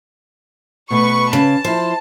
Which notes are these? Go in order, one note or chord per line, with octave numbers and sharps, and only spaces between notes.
B2 A3 B4 C#6
C#3 A5
F3 E4 C5